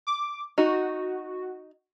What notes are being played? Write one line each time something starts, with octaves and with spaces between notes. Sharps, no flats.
D6
D#4 F#4